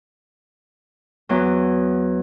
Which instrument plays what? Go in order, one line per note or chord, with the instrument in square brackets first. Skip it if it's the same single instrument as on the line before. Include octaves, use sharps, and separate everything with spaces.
[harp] E2 F#3